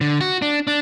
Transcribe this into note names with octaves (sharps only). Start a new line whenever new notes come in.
D3
F#4
D4
D4